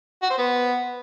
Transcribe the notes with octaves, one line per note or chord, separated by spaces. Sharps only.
F#4
C5
B3